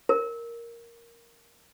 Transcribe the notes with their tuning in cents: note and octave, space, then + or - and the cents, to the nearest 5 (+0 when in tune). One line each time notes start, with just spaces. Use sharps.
A#4 +0